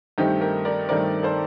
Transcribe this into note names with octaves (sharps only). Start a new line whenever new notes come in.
G2 D#3 A3 C4 D#4 G4
G4 A#4
A#4 D5
G2 D#3 A3 C4 A#4 D5
A4 C5